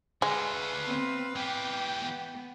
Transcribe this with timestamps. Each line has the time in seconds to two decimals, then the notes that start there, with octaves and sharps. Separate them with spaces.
0.22 D3 G#3 A3 B4 F5
0.87 B3 C4
1.36 E3 G4 G5
2.03 B3